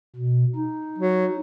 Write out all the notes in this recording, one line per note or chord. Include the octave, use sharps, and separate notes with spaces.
B2
D#4
F#3